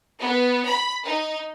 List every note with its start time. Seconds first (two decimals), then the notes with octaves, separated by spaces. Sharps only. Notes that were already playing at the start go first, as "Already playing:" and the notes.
0.21 B3
0.66 B5
1.04 D#4